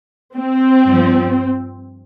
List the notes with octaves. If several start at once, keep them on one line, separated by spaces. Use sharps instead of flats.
C4
G2 F3